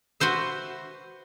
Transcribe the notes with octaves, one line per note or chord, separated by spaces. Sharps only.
F#4 B4 C5 E5